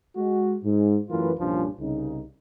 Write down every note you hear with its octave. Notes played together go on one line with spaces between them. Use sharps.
G#3 F#4
G#2
F#2 E3 A3 F4 A#4 B4
C2 G2 A#2 F3 C#4 D4
C2 C#3 D#4